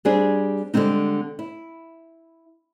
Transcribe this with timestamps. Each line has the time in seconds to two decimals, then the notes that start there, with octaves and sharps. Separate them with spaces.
0.05 G3 C4 D4 G#4
0.74 D3 G3 G#3 C4 D#4
1.39 E4